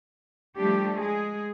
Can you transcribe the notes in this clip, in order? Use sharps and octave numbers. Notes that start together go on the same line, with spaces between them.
F3 G3 A3 D4 G4
G#3 G#4